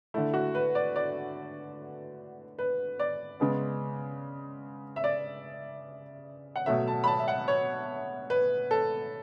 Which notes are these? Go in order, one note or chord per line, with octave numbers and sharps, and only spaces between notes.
D3 A3 E4
F#4
B4
D5
D5
B4
D5
C#3 G#3 B3
E5
D5
F#5
B2 F#3 A3 E5
A5
B5
A5
E5
F#5
C#5
B4
A4